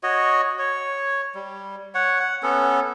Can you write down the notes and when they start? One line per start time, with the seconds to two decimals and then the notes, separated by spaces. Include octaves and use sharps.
0.03 F#4 C#5 D#5
0.59 C#5
1.35 G3
1.95 C#5 F#5
2.20 F#5
2.43 B3 C#4 A4